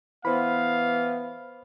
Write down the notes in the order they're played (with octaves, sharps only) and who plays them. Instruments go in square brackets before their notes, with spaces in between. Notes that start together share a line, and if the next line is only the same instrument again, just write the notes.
[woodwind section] E3 B3 [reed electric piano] C5 B5 [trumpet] F5